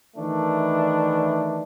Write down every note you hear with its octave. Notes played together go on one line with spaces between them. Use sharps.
D#3 E3 A3 D4